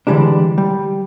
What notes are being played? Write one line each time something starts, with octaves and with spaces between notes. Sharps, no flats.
D3 E3 G3 G#3 D4
G3